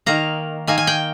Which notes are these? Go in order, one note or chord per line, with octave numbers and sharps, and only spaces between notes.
D#3 A#3 A#5
D#3 A#3 G#5
G#5
G5